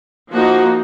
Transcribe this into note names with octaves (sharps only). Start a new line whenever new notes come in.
F3 A#3 D#4 F#4